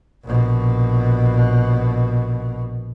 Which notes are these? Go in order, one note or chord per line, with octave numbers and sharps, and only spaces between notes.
A#1 B2